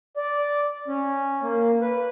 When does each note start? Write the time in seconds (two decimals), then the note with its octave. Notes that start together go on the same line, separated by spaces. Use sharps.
0.17 D5
0.88 C#4
1.43 A#3
1.81 B4